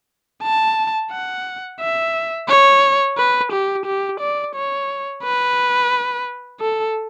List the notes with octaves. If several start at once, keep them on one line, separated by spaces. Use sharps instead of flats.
A5
F#5
E5
C#5
B4
G4
G4
D5
C#5
B4
A4